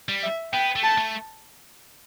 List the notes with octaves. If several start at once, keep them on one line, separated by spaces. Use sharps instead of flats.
G3
E5
B3 G5
A3
A5
A3